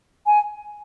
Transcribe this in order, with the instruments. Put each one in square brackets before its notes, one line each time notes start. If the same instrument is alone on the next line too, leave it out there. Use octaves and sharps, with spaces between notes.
[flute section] G#5